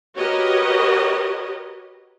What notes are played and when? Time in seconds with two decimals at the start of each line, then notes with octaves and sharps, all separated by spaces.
0.16 F#4 G4 A#4 B4 C#5 D#5